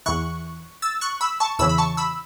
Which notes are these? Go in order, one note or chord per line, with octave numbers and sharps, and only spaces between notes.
E2 E3 C#6 F#6
E6 A6
C#6 F#6
B5 E6
A5 C#6
E2 C#3 E3 B5 E6
B5
A5 C#6
B5 E6